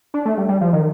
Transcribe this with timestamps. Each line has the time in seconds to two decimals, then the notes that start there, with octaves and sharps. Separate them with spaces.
0.14 D4
0.25 A3
0.37 G3
0.49 G3
0.61 F3
0.73 D#3